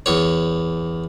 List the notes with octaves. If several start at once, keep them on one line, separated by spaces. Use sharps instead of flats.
E2 C#5